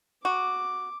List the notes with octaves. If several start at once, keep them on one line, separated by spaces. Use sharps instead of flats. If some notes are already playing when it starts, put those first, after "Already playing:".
F#4 D6